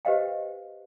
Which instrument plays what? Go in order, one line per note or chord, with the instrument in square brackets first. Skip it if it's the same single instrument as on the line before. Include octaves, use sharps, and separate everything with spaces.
[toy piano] G4 B4 C5 D#5 F5 G5